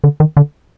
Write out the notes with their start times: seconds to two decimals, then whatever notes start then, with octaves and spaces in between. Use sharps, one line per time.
0.04 D3
0.20 D#3
0.37 D3